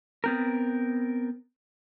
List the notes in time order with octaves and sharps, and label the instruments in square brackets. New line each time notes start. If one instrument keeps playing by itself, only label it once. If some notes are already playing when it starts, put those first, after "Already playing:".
[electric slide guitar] B3 C4 A#4